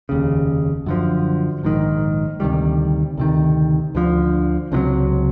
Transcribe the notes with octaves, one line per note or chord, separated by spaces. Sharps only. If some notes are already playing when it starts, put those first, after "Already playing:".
F1 D#2 C#3
F#2 D3 F3
A#1 G#2 D#3
D2 C3 D#3 G3
D2 C3 D#3
D2 D3 F3
C#2 C3 D#3 F#3